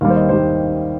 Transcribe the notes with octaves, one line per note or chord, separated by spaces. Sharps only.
D#2 D#3 G3 F5
C5
D#5
D#2 D#3 G3 C5